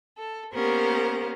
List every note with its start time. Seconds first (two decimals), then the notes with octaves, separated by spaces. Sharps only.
0.17 A4
0.54 A#3 B3 C#4 G4 A#4 C5